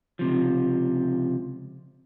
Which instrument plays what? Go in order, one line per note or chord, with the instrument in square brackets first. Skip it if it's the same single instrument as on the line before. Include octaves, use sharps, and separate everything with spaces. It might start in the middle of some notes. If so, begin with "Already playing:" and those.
[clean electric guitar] C#2 C3 F3